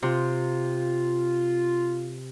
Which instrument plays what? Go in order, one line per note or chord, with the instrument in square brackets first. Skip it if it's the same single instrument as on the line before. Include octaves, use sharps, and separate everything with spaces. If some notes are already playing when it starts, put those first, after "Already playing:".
[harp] C3 [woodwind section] F4